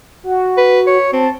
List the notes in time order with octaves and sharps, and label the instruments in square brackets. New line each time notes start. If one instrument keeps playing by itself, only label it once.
[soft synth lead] F#4
[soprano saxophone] B4
C#5
[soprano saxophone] C4 [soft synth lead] A5